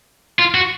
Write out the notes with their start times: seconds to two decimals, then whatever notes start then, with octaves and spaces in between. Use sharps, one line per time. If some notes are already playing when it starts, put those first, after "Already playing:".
0.39 F4
0.54 F#4